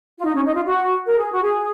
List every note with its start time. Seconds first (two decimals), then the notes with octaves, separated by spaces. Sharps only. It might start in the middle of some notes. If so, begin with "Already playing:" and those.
0.18 F4
0.25 D#4
0.34 C#4
0.44 D#4
0.54 F4
0.65 F#4
1.05 A#4
1.18 G#4
1.31 F#4
1.43 G#4